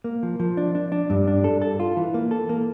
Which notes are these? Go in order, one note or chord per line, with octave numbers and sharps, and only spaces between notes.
A#3
F3
F3
D4
D4
D4
G2
D4
A4
A4
F4
E3
A#3
A4
A#3